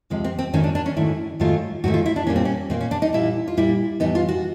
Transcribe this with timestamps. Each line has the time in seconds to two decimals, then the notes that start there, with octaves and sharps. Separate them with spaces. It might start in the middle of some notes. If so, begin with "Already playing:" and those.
0.10 D2 C3 F3 G#3
0.24 C4
0.39 C4
0.53 G#2 D#3 F#3 A3 C#4
0.64 D4
0.75 D4
0.86 C#4
0.96 G#2 D#3 F#3 A3 E4
1.40 G#2 D#3 F#3 A3 F4
1.84 G#2 D#3 F#3 A3 F#4
1.94 F4
2.06 E4
2.16 D4
2.27 A#2 G3 A#3 C#4
2.36 C4
2.45 C#4
2.70 A#2 G3 A#3 C4
2.81 C#4
2.91 D4
3.02 D#4
3.13 A#2 G3 A#3 E4
3.48 F4
3.57 A#2 G3 A#3 E4
4.00 A2 E3 G3 B3 D#4
4.15 F4
4.29 F#4